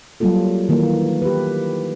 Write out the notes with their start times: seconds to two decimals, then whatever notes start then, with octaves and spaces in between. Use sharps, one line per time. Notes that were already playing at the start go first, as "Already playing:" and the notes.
0.20 F#3 G3 A#3 F4 A4
0.69 D#3 E3 A#3
1.22 G4 B4